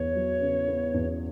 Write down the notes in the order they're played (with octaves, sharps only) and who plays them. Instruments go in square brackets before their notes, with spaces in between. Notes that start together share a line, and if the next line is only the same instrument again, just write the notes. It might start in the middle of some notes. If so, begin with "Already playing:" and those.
Already playing: [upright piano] E2 B3 [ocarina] C#5
[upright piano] F#3
C#3
B3
E2